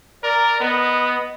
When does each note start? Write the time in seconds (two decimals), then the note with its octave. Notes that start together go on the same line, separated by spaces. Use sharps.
0.24 A#4 D5
0.60 B3 D#5